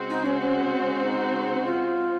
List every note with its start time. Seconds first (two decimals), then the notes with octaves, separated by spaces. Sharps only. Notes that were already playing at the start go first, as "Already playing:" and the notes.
Already playing: C#3 G#3 C4 F#4 C5
0.09 D#4
0.25 C#4
0.40 C#4
1.03 D#4
1.65 F4